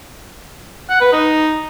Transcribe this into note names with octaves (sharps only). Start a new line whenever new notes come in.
F#5
B4
D#4